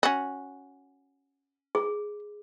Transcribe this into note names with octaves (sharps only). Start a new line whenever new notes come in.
C#4 F#4
G#4